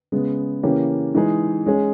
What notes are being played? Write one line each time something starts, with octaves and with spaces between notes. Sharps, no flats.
C#3 G#3 B3
C#3 E3 A#3 C#4 G4
E3 G#3 D#4 G#4
G#3 C#4 G#4